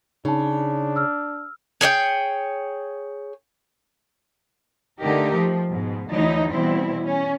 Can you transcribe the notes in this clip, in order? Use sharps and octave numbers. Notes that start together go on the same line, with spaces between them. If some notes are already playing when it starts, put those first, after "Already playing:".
C#3 D4 D#4 A5
E6 F6
G#4 C#5 D5 G5
D3 A3 D#4 G4 A#4
F3
G#2 B2
D2 E3 F#3 D#4 E4
B2 E3 G3 C4 E4
C#4